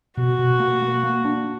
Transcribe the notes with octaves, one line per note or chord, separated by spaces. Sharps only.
B2 F#4
B2
A#3
A#3
A#3
D4